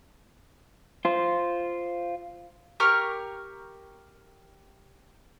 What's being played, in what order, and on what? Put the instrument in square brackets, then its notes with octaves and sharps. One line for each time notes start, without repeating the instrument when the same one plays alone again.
[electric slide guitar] F4 C5
[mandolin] G4 A#4 C#6 F6